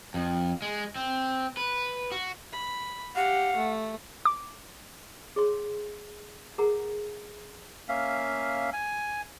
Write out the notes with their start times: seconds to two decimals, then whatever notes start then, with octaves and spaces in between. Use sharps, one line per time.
0.14 F2
0.62 G#3
0.96 C4
1.57 B4
2.12 F#4
2.53 B5
3.16 G4 F5 F#5
3.56 A3
4.25 D6
5.36 G#4 C#5 C6
6.58 G#4 A#4 F#5 A#5
7.88 A#3 C#4 E5 F5
8.73 G#5